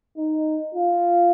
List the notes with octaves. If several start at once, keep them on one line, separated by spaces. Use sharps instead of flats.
D#4
F4